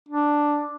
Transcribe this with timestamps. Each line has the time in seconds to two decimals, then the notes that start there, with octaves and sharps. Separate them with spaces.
0.09 D4